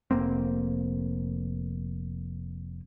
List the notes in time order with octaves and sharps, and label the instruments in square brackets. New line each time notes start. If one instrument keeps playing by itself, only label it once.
[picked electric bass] F1 A#3 C4